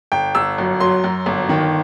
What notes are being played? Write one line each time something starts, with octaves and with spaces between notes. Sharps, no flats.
G1 G5
G1 E6
F#2
F#3 C6
F#2
G1
D#3